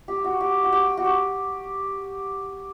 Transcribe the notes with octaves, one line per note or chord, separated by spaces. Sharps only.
G4
F#4
G4
F#4
G4
F#4
G4